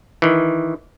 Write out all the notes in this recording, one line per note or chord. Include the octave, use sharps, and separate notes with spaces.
D#3 E3